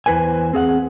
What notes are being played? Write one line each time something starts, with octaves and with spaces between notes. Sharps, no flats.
E2 E4 B4 C5 G#5
C4 G#4 F5 F#5